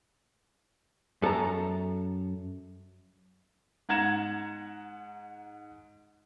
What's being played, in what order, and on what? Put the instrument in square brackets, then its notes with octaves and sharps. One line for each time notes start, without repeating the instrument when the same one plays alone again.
[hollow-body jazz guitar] F#2 A4 A5 A#5
[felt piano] G#2 F#5 A#5 G#6 E7